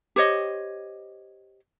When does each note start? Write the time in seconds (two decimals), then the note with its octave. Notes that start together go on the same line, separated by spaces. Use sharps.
0.16 G4 C5 C#5 D#5